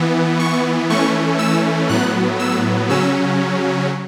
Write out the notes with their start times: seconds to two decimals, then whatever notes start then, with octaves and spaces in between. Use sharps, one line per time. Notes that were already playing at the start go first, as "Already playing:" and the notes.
Already playing: E3 B3
0.39 C#6
0.89 E3 A3 C#4 C#6
1.39 E6
1.89 A2 F#3 B3 F#6
2.39 E6
2.89 C#3 F#3 C#4 E6